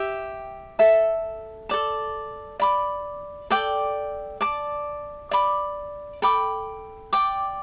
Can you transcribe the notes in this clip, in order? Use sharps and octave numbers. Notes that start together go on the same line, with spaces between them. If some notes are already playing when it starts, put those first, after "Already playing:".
Already playing: G4 E5 G5
A4 E5 A5
A4 D5 A5
D5 B5 D6
A4 D5 G5 D6
D5 A5 D6
D5 B5 D6
A4 G5 B5 D6
D5 G5 D6